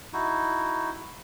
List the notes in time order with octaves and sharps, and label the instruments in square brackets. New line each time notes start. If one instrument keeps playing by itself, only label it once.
[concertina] D#4 E4 F#4